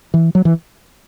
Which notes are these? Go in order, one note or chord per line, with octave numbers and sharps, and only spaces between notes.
E3
F#3
E3